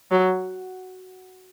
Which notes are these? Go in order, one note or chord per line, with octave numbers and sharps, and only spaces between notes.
F#3